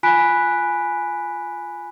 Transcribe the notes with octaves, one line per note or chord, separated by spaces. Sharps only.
F4 G#5 B5 F#6 B6 D7